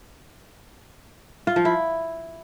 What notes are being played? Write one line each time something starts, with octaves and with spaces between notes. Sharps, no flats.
F4
F3
E4